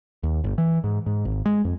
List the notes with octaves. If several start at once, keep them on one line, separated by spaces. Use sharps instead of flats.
D#2
G1
E3
G#2
G#2
G#1
G#3
F2